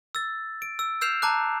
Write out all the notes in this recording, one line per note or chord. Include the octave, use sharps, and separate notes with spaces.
E6 A6
D7
E6
E6 F6 G6 C7 E7 F7
A5 A#5 D6 F#6